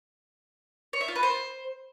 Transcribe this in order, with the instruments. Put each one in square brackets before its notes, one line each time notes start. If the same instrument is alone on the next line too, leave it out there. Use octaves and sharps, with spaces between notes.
[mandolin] C#5
E5
F4
B4
C5